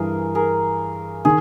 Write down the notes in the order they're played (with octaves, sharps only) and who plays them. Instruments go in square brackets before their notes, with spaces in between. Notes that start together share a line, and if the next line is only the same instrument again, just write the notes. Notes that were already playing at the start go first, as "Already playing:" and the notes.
Already playing: [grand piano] G2 E3 [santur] G#4 A#4
[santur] G#4 A#4
[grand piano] D#3 [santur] G#4